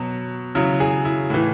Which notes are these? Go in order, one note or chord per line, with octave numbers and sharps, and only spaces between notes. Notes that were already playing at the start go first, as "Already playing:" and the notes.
Already playing: B2 F#3
C#3 F#3 E4
G#4
E4
A2 E3